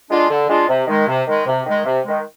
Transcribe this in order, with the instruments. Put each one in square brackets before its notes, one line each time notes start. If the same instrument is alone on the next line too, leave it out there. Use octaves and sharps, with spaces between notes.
[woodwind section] G#3 D4 F4
D3
G#3 D4 F4
C3
D#3 G#3
C3
D#3 G#3
C3
D#3 G#3
C3
D#3 G#3